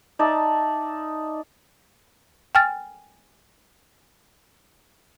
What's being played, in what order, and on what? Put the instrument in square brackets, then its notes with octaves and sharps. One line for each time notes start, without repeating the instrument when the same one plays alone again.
[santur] D#4 D5 E5 A5
[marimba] G5 G#5 F6 A6